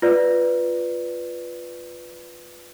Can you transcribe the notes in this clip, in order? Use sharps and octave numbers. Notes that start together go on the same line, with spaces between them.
F4 B4 D5